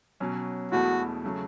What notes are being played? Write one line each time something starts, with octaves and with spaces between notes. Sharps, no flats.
B2 F#3 C#4
E1 E2 B2 A3 E4 F#4
C#3 F#3 A3